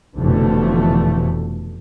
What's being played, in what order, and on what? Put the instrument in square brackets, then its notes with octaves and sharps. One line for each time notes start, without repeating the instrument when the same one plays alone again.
[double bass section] F1 B2 D3 E3 F3 A3